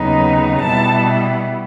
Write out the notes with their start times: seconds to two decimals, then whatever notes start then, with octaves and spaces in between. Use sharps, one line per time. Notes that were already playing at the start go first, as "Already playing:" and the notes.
Already playing: D#2 C#3 F#3 B3 D#4
0.62 B2 G3 B3 E4 A5